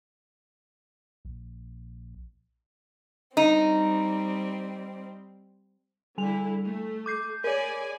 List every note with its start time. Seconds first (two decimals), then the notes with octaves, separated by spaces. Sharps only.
1.25 A#1
3.37 G3 C4 D#4
6.18 D3 G3 E4 F7
6.65 A3
7.06 D6 G6 C7
7.44 G#4 A#4 C#5 D5 G#5